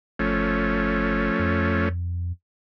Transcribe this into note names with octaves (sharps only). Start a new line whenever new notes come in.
G1 F3 A3 C#4
F2